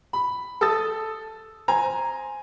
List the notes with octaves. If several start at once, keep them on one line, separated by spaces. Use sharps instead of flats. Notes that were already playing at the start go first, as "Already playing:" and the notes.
B5
A4 D#6 E6 A6
C5 G#5 A#5